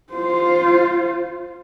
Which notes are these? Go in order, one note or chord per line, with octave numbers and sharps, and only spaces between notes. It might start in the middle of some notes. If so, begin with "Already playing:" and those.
F4 C5